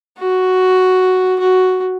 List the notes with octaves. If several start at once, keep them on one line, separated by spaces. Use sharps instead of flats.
F#4
F#4